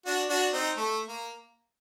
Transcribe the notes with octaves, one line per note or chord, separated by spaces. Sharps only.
D4 F#4
D4 F#4
C4 D#4
A3
A#3